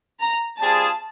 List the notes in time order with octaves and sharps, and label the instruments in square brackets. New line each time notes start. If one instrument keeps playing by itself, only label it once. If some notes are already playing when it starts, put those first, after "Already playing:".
[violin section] A#5
[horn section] G3 C4 F4 G#4 [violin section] A5